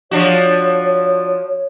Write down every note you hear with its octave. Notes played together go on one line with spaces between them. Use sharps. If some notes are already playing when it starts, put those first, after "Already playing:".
F3 D4 F#4 C#5